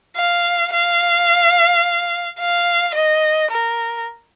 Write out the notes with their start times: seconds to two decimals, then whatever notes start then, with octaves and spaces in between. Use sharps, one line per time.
0.17 F5
0.73 F5
2.39 F5
2.95 D#5
3.51 A#4